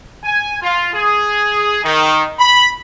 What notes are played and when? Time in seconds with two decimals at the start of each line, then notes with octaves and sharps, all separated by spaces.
0.24 G#5
0.62 F4
0.94 G#4
1.84 D#3
2.39 B5